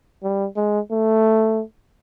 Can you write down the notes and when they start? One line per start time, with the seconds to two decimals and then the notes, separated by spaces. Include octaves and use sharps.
0.23 G3
0.56 G#3
0.91 A3